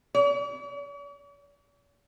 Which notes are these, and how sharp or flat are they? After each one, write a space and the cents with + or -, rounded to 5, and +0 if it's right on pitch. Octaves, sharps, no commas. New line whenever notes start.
C#5 +45